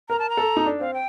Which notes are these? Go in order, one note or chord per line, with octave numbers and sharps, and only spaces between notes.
A#4 A#5
A5
A#5
A4
D#4
D4
C4 F5
G5